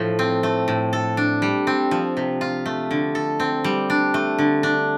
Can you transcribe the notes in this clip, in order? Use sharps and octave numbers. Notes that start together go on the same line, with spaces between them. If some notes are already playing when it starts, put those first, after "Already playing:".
Already playing: A2 F3 A3
C4
A3
A2
A4
D4
G3
C4
F3
C3
F4
A3
D3
A4
C4
G3
D4
A3
D3
D4